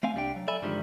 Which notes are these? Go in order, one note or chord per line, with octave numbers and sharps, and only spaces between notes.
A3 C4 F5 G#5
C2 G3 D4 G5
F#3
A4 D5 E5 G#5 B5
G2 D3 D#3 F3 G3 G#3